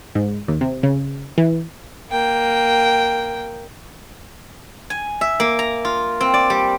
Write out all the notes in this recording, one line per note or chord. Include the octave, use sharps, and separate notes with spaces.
G#2
D#2
C3
C#3
E3
A#3 G5
G#5
E5
A#3
A#5
F4
C4
D5
G3